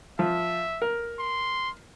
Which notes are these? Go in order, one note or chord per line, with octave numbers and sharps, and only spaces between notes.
F3 E5
A#4
C6